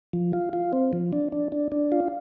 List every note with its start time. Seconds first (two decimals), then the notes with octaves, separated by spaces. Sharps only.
0.13 F3
0.33 F4
0.53 F4
0.73 C4
0.93 F3
1.13 D4
1.32 D4
1.52 D4
1.72 D4
1.92 F4